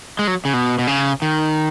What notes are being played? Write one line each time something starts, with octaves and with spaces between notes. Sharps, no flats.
G#3
F#3
C#3
B2
B2
C#3
D#3